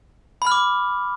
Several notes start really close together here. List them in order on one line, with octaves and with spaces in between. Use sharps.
B5 F6 D6